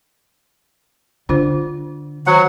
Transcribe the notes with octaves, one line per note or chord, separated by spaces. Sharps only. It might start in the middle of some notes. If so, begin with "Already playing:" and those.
D3 D4 F4 C5
D#3 F#3 C5 F#5 A#5